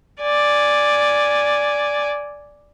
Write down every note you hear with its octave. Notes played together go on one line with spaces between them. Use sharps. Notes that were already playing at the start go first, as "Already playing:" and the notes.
D5 G#5